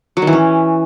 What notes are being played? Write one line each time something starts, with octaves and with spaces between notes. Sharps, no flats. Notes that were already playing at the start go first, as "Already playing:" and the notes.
F#3
D#3
E3
C#4